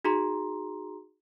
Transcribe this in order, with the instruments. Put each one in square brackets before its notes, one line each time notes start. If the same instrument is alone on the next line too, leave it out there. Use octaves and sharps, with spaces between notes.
[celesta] D#4 F#4 G#4 A#5 C6